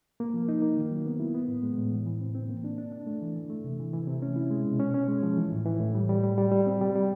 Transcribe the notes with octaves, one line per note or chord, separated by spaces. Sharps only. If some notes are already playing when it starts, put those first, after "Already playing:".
A#3
F3
D#4
A#3
D#3
F#3
B3
E4
B3
A2
G#3
A2
E3
E3
C4
C4
A#3
D4
D4
D4
A3
E3
E3
A3
C3
E3
E3
C3
C#4
E4
G#3
B2
C#4
C#4
G#3
F3
E3
A2
E3
A2
G3
G3
G3
G3
G3
C4
G3
G3